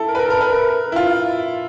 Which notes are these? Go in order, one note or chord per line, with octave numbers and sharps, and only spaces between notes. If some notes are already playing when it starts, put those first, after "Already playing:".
Already playing: E4 A4
A#4
B4
A#4
A4
A#4
B4
A#4
E4
F4